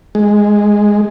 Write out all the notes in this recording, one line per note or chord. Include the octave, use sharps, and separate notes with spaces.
G#3